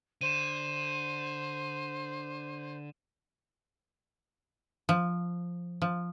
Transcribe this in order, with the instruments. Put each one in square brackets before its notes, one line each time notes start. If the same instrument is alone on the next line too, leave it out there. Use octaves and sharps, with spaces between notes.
[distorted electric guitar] D3 [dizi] C5 [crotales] D#7 E7
[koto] F3
F3